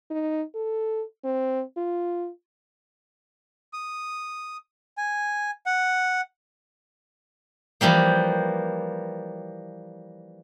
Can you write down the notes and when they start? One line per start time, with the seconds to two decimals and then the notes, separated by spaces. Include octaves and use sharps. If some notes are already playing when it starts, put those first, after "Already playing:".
0.11 D#4
0.55 A4
1.25 C4
1.77 F4
3.73 D#6
4.98 G#5
5.66 F#5
7.81 E3 F3 G3 A#3